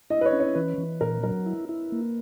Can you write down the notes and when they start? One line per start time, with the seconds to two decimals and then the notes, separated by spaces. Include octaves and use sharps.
0.10 E4 D#5
0.21 B4
0.26 C#5
0.33 C#4
0.40 C#5
0.55 E3 B4
0.78 E3
1.01 A#2 A#4
1.23 F#3 A#4
1.46 E4
1.69 E4
1.92 A#3